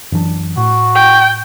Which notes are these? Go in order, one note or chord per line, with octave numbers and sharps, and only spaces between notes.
F#2 E3 D4
A2 F#4
G5